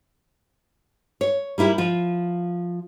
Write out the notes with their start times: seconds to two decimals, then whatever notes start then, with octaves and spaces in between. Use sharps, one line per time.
1.21 C#5
1.58 G3 A#3 E4 G4
1.78 F3 F4